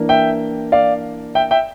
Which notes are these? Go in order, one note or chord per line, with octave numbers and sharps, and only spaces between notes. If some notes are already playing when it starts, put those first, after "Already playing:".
Already playing: E3 A#3 D4
E5 G5
D5 F5
E5 G5
E5 G5